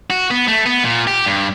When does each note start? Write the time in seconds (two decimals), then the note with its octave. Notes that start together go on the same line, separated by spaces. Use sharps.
0.10 F#4
0.31 B3
0.48 A3
0.66 B3
0.84 A#2
1.07 G4
1.26 G2